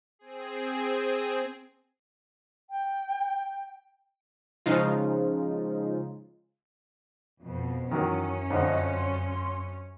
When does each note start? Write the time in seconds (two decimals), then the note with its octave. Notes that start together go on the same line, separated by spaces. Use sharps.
0.19 C4 G#4
2.70 G5
4.66 C#3 F3 G#3 D#4 F4
7.41 F2 B2
7.91 F#2 D#3 E3 F#3 C#4
8.50 F2 D3 D#5
8.94 C6